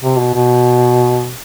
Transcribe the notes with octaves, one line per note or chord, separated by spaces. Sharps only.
C3
B2
B2